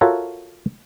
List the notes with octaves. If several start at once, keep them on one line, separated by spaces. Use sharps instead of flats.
F4 F#4 A4 A#4 C#5 E5